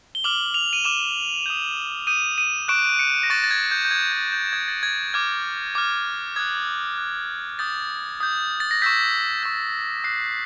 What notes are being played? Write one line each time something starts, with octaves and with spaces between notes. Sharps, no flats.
G7
D6 F6 F#7
F7
D#7
D6 F6 E7
D#6 G6
D#6 G6 D#7
D#7
C#6 F#6 D7
C#7
A#6
C#6 F#6 A6
A6
G#6
G6
G6
D#6 F#6 G#6
G6
G6
D#6 F#6 G#6
A6
G#6
D6 F6 G#6
D6 F6
D#6 F#6 G#6
D#6 F#6
D#6 G6 A6
D#6 G6
A6
A#6
C#6 E6 G6 B6
C#6 E6 G6
D#6 F#6 C7